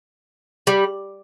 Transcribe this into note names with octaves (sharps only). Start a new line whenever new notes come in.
G3